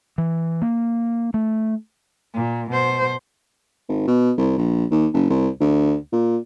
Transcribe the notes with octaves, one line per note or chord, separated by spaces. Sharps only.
E3
A#3
A3
A#2
B2 C5
G#1
B2
C2
A#1
D#2
F#1
C2
D2
A#2